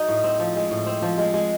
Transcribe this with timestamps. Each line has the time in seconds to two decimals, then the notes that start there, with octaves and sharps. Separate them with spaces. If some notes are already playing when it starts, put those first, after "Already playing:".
Already playing: F#3 D#4
0.08 A2
0.24 C4
0.39 F3
0.56 G#3
0.71 A2
0.87 C4
1.02 F3
1.18 G#3
1.34 G#3